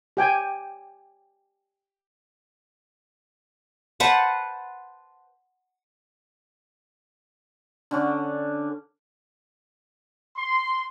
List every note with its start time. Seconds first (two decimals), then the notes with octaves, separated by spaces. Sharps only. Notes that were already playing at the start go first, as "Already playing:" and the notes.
0.17 G4 G5 G#5
4.00 B4 C5 F#5 A5
7.91 D3 C#4 D4
10.37 C6